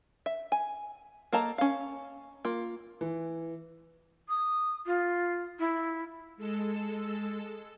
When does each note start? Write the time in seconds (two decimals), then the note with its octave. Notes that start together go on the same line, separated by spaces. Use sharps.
0.26 E5
0.52 G#5
1.33 A#3 A4 D#5 A5 A#5
1.58 C#4 F5
2.45 A#3 F4
3.01 E3
4.28 D#6
4.86 F4
5.59 E4
6.37 G#3 A4 E6